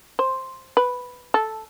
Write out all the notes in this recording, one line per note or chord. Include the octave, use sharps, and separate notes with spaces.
C5
B4
A4